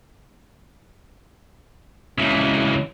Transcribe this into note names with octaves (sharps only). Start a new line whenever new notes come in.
C#2 E3